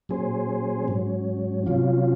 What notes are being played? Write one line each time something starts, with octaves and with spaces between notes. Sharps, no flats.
A#2 F#3 C#4 G#4 C5
G#2 F#3 C#4
C3 F#3 C#4 F4